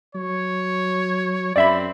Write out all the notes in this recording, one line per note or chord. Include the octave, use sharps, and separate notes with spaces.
F#3 C#5
F#2 C4 D5 E5 B5